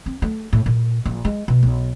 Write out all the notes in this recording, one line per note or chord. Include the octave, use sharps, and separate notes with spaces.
C4
A3
A2
A#2
A#1
G#3
B2
B1